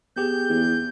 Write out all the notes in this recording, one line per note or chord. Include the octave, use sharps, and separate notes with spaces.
B3 G4 G#4 G6
E2